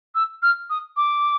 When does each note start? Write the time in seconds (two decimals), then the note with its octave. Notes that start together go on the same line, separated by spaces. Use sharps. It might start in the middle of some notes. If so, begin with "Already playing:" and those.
0.15 E6
0.42 F6
0.70 D#6
0.97 D6